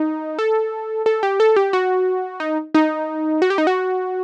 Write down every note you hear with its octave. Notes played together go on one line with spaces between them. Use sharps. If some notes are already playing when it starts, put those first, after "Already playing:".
Already playing: D#4
A4
A4
G4
A4
G4
F#4
D#4
D#4
F#4
G4
D#4
F#4